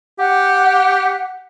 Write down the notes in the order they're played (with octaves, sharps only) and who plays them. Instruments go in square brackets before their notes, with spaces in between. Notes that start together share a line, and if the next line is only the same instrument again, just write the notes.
[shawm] G4 [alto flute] F#5